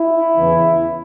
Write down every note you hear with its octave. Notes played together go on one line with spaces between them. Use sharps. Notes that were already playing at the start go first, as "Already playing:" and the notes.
Already playing: E4
E2 C#3 E3